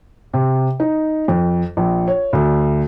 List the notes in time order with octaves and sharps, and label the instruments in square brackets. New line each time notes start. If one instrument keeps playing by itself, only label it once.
[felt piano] C3
D#4
F2
A#1
C#5
D2